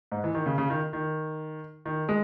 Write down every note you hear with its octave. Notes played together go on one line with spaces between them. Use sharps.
G#2
E3
D#3
C#3
C#3
D#3
D#3
D#3
G#3